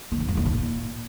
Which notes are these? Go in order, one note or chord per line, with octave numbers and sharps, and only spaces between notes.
D#3
G#2
E2
D#3
A#2